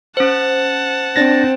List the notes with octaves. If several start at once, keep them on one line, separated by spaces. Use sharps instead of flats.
C#4 C5 F#5 A5
C4 D4 A6 A#6